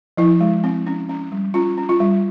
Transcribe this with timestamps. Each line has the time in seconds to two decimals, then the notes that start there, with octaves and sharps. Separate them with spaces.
0.17 F3 E4
0.41 G#3
0.64 C4
0.87 C#4
1.09 C#4
1.32 G3
1.54 C#4 F4
1.78 C#4
1.89 F4
2.00 G3